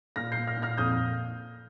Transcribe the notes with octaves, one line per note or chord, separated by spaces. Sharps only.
A#2 F6 A#6
G6 C7
A#2
F6 A#6
A#2
F6 A#6
F2 D#6 G6